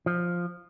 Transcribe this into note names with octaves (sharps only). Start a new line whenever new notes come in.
F3